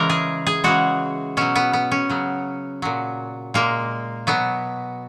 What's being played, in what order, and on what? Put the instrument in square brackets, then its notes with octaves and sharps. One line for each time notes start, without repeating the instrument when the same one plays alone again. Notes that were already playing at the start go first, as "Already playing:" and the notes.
Already playing: [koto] C#3 E3 G#3 A#4
G#4
G#4
C#3 E3 G#3 F#4
B2 F#3 C#4
B3
B3
C#4
C#3 F#3
A#2 F#3
A#2 G#3 A#3
B2 F#3 B3